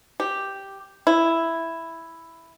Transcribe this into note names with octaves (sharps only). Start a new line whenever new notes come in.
G4
E4